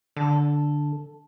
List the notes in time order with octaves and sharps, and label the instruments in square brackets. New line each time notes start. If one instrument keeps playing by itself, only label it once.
[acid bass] D3 [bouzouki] A4